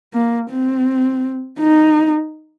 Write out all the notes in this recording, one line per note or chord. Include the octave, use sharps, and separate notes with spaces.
A#3
C4
D#4